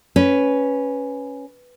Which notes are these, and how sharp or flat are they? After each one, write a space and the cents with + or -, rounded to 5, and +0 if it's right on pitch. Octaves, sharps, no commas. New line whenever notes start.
C#4 +0 B4 +0